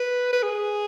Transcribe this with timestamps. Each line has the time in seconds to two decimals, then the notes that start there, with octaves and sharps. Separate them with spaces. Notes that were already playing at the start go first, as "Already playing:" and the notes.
Already playing: B4
0.33 B4
0.43 G#4